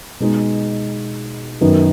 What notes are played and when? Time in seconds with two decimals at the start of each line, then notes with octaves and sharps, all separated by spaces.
0.20 B2 G#3 D#4
1.61 F#2 D#3 B3